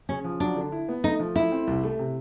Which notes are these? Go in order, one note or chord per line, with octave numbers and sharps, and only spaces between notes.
C#3 C#4
F3
F#3 D4
D3
E4
B3
A3 D#4
F3
A3 E4
C4
C2
A3
C3